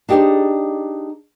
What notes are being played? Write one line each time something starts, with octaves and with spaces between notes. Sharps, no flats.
D4 D#4 G4 G#4 C5 D5